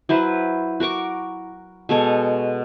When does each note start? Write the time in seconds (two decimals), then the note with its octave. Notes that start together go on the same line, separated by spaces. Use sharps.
0.09 F#3 E4 B4 C5
0.80 F#4 A#4 C#6 D6
1.89 B2 G#3 A4 C#5